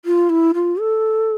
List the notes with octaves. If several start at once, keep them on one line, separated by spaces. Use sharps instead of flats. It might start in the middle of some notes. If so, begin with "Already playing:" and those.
F4
E4
F4
A4